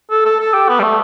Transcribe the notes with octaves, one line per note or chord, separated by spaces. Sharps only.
A4
A4
A4
G4
B3
G3
A3